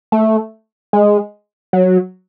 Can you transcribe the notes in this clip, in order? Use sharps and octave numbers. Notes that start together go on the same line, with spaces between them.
A3
G#3
F#3